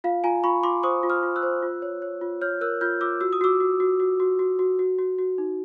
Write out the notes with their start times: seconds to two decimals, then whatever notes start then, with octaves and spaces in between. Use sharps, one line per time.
0.04 F4 F5
0.24 F4 G#5 A#5
0.44 F4 B5 C#6
0.63 F4 C6 D6
0.83 C5 C#6 D#6
1.03 F4
1.10 D#6 F6
1.23 F4
1.36 E6 F#6
1.43 C5
1.62 F4
1.82 C#5
2.02 C#5
2.21 F4
2.41 C#5 F6 G6
2.61 A#4 E6 F#6
2.81 F4 F6 G6
3.01 F4 D6 E6
3.21 F#4 E6
3.33 D#6
3.41 F#4 D6 E6
3.60 F#4
3.80 F#4
4.00 F#4
4.20 F#4
4.39 F#4
4.59 F#4
4.79 F#4
4.99 F#4
5.18 F#4
5.38 D#4